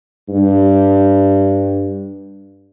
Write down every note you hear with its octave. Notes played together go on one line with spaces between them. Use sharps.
G2